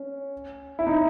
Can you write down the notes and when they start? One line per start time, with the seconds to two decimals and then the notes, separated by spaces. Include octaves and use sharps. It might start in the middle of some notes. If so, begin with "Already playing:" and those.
Already playing: C#4
0.79 E4
0.87 D#4